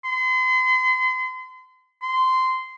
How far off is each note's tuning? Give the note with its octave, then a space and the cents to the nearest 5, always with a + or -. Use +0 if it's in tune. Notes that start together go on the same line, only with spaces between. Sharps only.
C6 -40
C6 -15